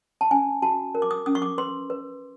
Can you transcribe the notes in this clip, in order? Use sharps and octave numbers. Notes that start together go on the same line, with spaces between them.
A5
C#4 G#5
F#4 A5
A#4
D6
D#6
C#4 D#6
C#6
D6
B4 C6
B4